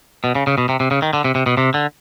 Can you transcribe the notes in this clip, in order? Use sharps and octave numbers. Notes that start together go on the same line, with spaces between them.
B2
C#3
C#3
B2
C3
C3
C#3
D#3
D3
C3
C3
B2
C3
D3